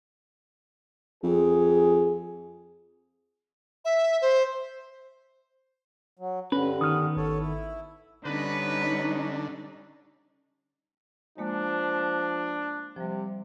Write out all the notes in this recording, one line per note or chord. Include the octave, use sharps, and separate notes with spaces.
F2 G#4
E5
C5
F#3
G2 D3 C#4 B4
D#3 B3 D#6 F6
G#1 A4 C#5
E4
D3 G3 B3 C#4 D#4 B4
F3 G#3 A#3 D4
C3 F3 G3